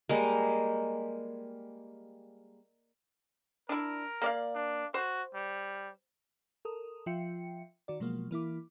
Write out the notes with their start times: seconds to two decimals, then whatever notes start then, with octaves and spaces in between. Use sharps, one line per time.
0.09 G3 G#3 A#3
3.69 D4 E4 A#4
4.22 A#3 D5 F5
4.55 D4
4.94 F#4 C5
5.34 G3
6.65 A4 A#4 D#6
7.06 F3 F4 E5 G5 C#7
7.88 D#3 F#4 D5
8.00 B2 F3 F#3 G#3 A#3
8.31 E3 A#3 E4 D6